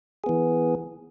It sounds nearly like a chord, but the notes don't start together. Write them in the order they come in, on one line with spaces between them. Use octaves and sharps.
G#4 B3 E3